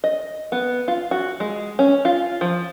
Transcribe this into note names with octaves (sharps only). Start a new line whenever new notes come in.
D#5
B3
F4
F#4
G#3
C#4
F4
F3